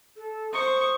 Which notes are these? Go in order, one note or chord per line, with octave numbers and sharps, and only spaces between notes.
A4
C5 C#6 D#6